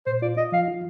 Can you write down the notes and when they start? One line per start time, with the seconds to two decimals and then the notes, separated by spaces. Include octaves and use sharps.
0.06 A#2 C5
0.22 F4 D5
0.37 F4 D#5
0.52 F3 F5
0.68 F4